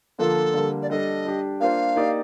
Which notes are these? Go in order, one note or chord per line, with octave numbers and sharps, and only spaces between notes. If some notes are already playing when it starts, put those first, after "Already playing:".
D3 F3 A#3 D4 F4 A4
D3 G3 A#3
D5
G3 D4 A4 D#5
G3 D4 G4
A#3 D4 F4 C5 F5
A#3 D#4 G4 D5